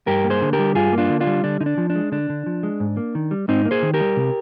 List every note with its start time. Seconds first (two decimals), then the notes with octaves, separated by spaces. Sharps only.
0.07 G2 G4 A#4
0.24 A#3
0.30 G#4 C5
0.42 D3
0.53 G4 A#4
0.59 G3
0.75 G2 F4 G#4
0.93 A#3
0.98 D4 F4
1.10 D3
1.20 D4 F4
1.27 G3
1.44 D3 D4
1.61 D3 D#4
1.66 D4
1.78 F3
1.90 D4
1.95 G#3
2.12 D3 D4
2.30 D3
2.46 F3
2.63 G#3
2.80 G#2
2.97 A#3
3.15 D#3
3.31 G3
3.48 G#2 C4 D#4
3.65 A#3
3.71 G#4 C5
3.82 D#3
3.94 G4 A#4
4.01 G3
4.17 C3